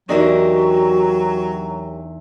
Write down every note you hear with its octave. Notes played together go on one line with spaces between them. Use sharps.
E2 E3 F#3 D4 D#4 F#4 G4 A#4